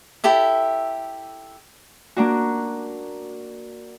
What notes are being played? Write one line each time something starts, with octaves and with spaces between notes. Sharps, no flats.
E4 G4 A4 E5
A#3 D4 F#4